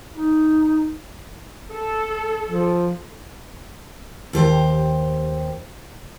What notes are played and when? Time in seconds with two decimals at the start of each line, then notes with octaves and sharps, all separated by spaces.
0.15 D#4
1.71 A4
2.46 F3
4.33 D#2 G4 C5